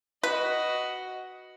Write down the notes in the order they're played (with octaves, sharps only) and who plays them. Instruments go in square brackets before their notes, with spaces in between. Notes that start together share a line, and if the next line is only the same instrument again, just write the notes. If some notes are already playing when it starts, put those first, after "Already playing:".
[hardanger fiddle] F#4 D#5 [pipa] B4